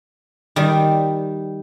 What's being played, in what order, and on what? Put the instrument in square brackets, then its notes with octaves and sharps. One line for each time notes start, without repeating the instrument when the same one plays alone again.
[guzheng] D#3 G3